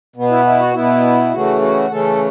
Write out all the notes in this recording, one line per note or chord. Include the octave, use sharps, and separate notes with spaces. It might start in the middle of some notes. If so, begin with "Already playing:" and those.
B2 B3
E4
E4
F#4
B2 B3 E4
C#3 E3 A3 C#4 F#4
F#4
C#3 E3 A3 C#4 A4